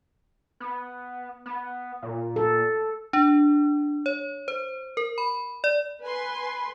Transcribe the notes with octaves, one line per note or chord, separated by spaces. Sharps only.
B3
B3
A#2
A4
D4
C#5
C5
A#4
B5
D5
B4 G#5 C6